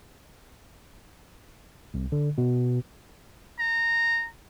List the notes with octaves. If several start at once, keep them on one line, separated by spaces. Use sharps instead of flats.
C2
D3
B2
A#5